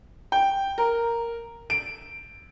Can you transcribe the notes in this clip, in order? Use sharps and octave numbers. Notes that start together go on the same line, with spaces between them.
G5
A#4
D7